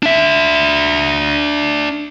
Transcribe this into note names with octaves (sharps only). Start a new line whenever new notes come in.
D4 E5